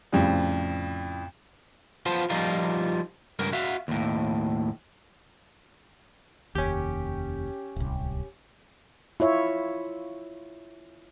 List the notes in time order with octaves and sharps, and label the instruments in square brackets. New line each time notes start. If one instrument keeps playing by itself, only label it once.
[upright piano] F2 A2 C#3 G3
[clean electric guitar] B3 F4 C5 A5
F3 G3 D#4 F4 A#4
C#2 G2 A#4
F#4 E5 F5
D#2 A2
[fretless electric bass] F1 D#2 [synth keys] C#4 G4
[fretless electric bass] D1 C2
[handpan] E4 F4 C#5 E5